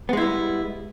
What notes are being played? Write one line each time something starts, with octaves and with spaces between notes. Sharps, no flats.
G3 G#3 B3 E4